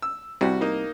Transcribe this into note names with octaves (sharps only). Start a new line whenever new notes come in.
E6
C2 C3 G3 F#4
A#3 D#4